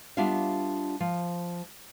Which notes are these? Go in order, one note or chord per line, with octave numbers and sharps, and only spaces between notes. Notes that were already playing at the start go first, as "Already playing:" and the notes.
G3 B3 D4 F4 E5 F5
F3